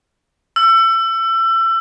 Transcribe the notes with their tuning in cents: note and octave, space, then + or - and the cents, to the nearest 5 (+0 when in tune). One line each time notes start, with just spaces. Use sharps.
E6 +30